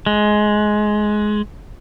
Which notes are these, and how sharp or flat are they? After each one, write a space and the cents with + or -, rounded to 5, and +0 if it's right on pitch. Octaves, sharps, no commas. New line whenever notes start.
G#3 +15